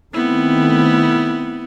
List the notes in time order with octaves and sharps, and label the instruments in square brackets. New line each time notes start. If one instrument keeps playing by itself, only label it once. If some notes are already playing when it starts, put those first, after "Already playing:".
[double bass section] D#3 A3 C4 [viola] B3 E4